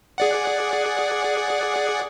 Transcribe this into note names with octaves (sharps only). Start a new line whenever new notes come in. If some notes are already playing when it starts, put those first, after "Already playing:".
G#4 D5 F#5